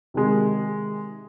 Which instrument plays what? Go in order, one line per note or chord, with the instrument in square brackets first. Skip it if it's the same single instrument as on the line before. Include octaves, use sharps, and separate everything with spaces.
[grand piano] C3 D#3 G#3